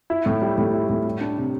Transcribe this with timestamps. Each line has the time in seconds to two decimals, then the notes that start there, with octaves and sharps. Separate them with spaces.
0.10 E4
0.26 A2
0.42 G3
0.58 A2
0.74 E4
0.89 A2
1.05 G3
1.21 D4
1.37 C3